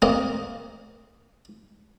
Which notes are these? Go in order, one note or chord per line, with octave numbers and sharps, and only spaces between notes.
A#3 C4 D#5